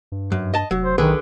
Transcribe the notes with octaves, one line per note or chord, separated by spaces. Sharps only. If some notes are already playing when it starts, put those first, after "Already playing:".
G2
F#2
D#5 A5
F1 F#3
C5
B1 D3 D#3 G#4 B4